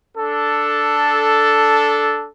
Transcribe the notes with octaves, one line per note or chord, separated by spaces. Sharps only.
D4 A4